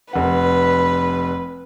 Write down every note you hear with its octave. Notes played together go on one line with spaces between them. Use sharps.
F1 B4 F#5